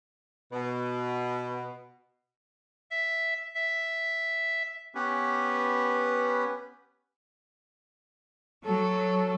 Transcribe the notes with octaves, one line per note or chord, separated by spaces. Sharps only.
B2
E5
E5
B3 C#4 G4 B4
F#3 A4